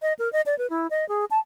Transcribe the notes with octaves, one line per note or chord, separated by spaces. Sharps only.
D#5
A#4
D#5
D5
B4
E4
D#5
G#4
A5